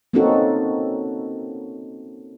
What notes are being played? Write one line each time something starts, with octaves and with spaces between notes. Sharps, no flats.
A#3 C4 C#4 D#4 F#4 A4